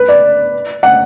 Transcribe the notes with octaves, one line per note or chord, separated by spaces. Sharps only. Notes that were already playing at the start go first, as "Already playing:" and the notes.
Already playing: B4
D5
F#5